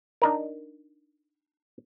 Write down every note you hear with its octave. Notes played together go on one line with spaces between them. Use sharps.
D4 D#4 A#4